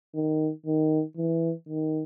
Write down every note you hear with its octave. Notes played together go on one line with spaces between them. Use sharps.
D#3
D#3
E3
D#3